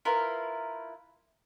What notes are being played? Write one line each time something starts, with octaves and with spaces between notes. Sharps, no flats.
E4 F4 A#4 B4